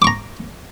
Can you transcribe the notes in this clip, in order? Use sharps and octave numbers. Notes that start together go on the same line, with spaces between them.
A#5 C#6 D6